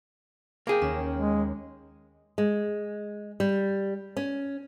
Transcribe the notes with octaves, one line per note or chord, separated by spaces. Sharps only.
A#3 G#4 G5 D6
D#2 C#4 E7
G#3
G#3
G3
C#4